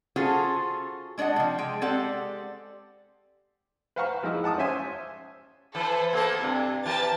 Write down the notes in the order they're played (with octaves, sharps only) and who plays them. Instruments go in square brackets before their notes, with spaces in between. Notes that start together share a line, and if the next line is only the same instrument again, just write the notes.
[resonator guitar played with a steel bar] C#4 F4 F#4 G#4 A4 C5
G#3 D4 D5 D#5 F#5
C3 F3
G#3 G5
G#3 C4 G4 A4 D5 F#5
[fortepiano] B4 C5 F5 F#5 A#5 C#6
F3 G#3 D#4 E4
F#5 A5 D6 D#6
C#4 C5 E5 G#5 C6
[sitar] E3 [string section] A4 B4 C5
[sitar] A#3 B3 C5 [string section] A4
[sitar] G2 [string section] C3
[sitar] E3 G4 A#4 [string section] A5 A6